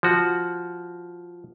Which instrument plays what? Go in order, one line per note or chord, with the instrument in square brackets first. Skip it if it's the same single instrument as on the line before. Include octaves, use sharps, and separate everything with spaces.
[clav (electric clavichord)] F3 F#4